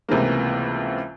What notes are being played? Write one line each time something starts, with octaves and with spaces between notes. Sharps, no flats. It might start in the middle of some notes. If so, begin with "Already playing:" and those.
C#2 C3 E3 A3 A#3